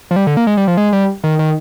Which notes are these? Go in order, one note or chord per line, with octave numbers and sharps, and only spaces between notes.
F3
G3
D3
A#3
G#3
G3
F3
G#3
G3
D#3
D#3